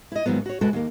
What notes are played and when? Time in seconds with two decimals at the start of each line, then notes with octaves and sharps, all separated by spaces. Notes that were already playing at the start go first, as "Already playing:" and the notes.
0.12 E4 D#5
0.26 G#2 D#3 F3 F#3 B3
0.46 F#4 C#5
0.61 C3 G#3 F#4 A4 B4
0.73 D#2 A#3